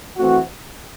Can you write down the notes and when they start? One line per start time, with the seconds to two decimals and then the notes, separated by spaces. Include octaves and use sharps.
0.18 E3 A3 C4 F#4